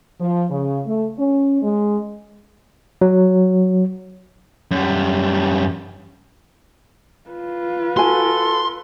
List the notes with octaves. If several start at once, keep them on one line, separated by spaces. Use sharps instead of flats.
F3
C#3
A3
C#4
G#3
F#3
F#2 G3
F4 B4
F#4 A4 G#5 C6